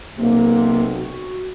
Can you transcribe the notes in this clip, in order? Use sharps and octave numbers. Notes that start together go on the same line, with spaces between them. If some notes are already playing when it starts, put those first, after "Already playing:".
B1 C3 A#3
F#4